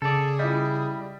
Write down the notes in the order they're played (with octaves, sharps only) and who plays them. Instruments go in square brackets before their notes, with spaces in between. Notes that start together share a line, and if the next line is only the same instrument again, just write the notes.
[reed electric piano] C#3 [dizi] G#4 [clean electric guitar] A4 D5
[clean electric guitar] G3 [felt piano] E4 D#5